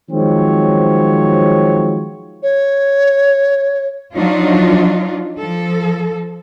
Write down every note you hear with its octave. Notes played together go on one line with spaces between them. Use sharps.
D#3 F3 F#3 G#3 C4 C#5
C#5
F3 F#3 D4 D#4 F4
F3 A4